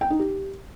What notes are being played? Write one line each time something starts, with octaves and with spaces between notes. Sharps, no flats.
G5
D#4
G4